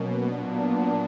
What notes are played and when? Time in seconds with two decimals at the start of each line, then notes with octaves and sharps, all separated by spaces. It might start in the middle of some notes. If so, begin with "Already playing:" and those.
Already playing: B2 F#3 A#3 C#4
0.32 A#2 F#3 B3 D4